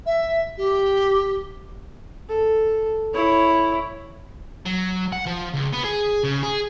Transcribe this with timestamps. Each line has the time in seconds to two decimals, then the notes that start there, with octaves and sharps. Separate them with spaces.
0.06 E5
0.58 G4
2.29 A4
3.14 E4 C#5
4.65 F#3
5.13 F#5
5.27 F3
5.53 C#2
5.72 B3
5.84 G#4
6.24 C#3
6.43 G#4